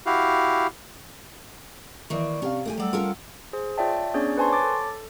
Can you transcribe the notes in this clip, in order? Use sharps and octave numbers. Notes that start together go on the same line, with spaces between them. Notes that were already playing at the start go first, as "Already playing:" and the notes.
E4 F#4 G4 F5
D#3 E3 A#3 D5 C#6
C3 C#4 F5
A3 E4 G4 G#5
F#3 G3 D5 F#5 E6
C#4 F4 A4 A#4
G#4 C5
F4 C#5 D5 E5 G5 A5
B3 C#4 D4 G#4 C#5 D5
B4 C5 G#5 A5 C6 C#6
C#5 A5 D6 A6
A4